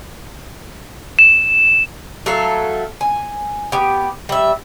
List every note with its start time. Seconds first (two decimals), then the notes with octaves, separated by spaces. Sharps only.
1.19 E7
2.26 F#3 A3 A4 F5
3.01 G#5
3.72 B3 G4
4.29 G3 E5